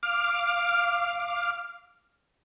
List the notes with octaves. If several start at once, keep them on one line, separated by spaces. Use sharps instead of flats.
F5 D6 F6